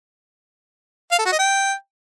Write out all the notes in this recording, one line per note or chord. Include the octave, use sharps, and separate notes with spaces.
F5
A4
F#4
D#5
G5